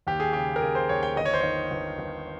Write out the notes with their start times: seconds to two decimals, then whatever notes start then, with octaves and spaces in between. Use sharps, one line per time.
0.07 D#2 G4
0.20 G#4
0.33 C#3 G4
0.56 A#4
0.62 C#3 G#4
0.75 C5
0.89 D#2 C#5
1.03 G5
1.17 G1 D#5
1.25 C#5
1.34 C5
1.41 D#3 C#5
1.71 G1
1.99 G1